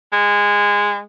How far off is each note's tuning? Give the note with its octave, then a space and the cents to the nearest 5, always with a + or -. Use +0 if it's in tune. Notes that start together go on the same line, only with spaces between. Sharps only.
G#3 -20